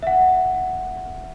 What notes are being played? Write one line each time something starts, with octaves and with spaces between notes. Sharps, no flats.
E5 F#5